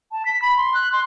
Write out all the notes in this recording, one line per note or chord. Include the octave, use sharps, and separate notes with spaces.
A5
B6
B5
C6
F#6
C6